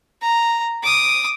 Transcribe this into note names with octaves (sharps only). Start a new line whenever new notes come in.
A#5
D6 D#6